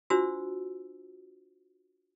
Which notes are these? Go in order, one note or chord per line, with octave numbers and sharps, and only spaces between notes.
D4 F4 F#4 C5 E6